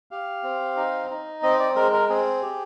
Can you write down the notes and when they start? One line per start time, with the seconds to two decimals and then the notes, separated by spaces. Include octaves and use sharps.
0.11 G4 F5
0.43 C4
0.76 D#4
1.10 D#4
1.42 C4 D#5
1.59 D5
1.76 G#3 A#4
1.93 A#4
2.09 C4 G#4
2.42 G4